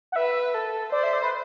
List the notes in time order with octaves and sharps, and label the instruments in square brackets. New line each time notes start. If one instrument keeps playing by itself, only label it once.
[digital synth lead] F#5
[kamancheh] B4 [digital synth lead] E5
[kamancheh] A4
[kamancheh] C5 [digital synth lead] D5
[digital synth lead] E5
D5
B4